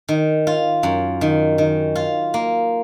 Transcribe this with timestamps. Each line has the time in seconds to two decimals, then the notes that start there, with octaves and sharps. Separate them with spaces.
0.08 D#3
0.47 F4
0.83 F#2
1.21 D#3
1.58 D#3
1.96 F4
2.34 A#3